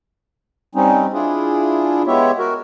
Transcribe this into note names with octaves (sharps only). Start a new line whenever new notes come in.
G3 C4 C#4 D#4
D4 E4 F4 G#4
G#3 B3 E4 G4 C#5 E5
F#4 A#4